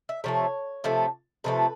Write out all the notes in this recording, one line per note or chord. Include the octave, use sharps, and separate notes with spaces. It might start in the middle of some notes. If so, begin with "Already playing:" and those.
E5
C3 F3 A3 C#5
C3 F3 A3
C3 F3 A3 B4